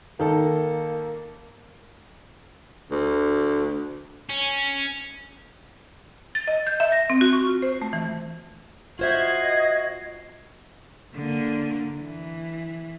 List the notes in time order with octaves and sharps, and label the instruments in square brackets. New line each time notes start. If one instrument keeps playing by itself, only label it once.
[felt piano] D#3 A4 [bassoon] A#3
[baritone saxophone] D2
[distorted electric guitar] C#4
[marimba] A6
D#5
G6
E5
A#6
C4
F#4
C#6
F4
C5
A3
E3
[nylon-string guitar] F4 C5 E5 [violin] F#4 C7 [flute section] D#5 G#6
[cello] D3 A#3
E3